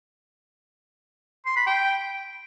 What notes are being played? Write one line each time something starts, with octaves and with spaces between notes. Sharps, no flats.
C6
B5
G5